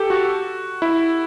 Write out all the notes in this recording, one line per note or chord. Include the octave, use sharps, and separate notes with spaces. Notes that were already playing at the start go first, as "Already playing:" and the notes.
Already playing: G4 A4
F#4
E4